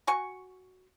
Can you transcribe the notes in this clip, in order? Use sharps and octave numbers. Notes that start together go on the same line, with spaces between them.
F#4 G#5 C#6